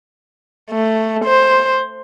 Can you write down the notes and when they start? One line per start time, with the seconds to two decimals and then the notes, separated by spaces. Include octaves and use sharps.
0.71 A3
1.25 C5